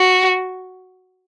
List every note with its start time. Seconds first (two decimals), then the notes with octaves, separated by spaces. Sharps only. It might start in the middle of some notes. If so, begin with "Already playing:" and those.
Already playing: F#4